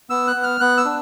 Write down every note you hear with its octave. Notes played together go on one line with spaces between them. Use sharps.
B3 E6
F#6
B3
F6
B3 F#6
E6
D4